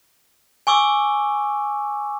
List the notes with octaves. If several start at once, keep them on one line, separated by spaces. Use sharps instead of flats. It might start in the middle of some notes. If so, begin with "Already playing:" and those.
G#5 C#6 D6 E6